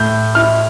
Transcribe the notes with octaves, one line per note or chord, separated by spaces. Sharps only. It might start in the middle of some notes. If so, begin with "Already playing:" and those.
Already playing: A2 G6
E4 F6